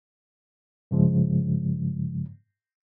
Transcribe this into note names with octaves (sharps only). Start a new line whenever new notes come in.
G2 C#3 F3 G#3